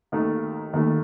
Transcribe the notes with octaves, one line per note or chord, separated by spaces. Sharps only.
D#2 D#3 A3
D#2 D#3 A3